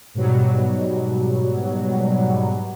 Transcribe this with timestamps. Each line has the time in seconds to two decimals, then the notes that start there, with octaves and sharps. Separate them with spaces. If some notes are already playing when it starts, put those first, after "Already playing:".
0.14 G#2 B2 F#3 G3